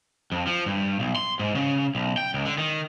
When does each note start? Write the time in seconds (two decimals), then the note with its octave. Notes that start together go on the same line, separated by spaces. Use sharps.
0.32 F2
0.47 F3
0.66 G2
1.00 B1
1.16 C6
1.39 G#2
1.55 C#3
1.95 B1
2.17 G5
2.34 C#2
2.46 D3
2.58 D#3